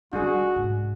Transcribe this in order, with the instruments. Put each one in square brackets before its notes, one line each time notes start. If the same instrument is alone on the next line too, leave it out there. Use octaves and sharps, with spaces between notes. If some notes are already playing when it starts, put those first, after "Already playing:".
[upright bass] G3 F4 [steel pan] D4 G#4 [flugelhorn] F#4
[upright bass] G#2